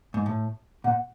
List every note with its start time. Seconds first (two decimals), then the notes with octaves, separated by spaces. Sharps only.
0.14 G#2
0.26 A2
0.84 A#2 F#5